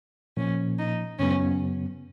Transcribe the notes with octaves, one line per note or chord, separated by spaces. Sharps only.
A#2 F3 A#3 C#4
D#4
F#2 C#3 F#3 B3 C#4